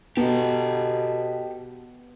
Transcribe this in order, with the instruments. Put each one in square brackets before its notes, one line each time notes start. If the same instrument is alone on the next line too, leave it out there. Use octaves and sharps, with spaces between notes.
[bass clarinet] B2 [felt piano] B3 [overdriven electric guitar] G4 A4